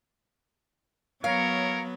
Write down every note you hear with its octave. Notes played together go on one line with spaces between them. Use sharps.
F#3 B3 A#4 C#5 F5